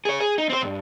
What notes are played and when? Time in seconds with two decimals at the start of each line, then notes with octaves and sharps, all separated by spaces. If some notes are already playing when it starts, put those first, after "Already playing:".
0.05 G#4 C#5
0.20 G#4
0.38 D#4
0.50 C4 C5
0.62 B1 G2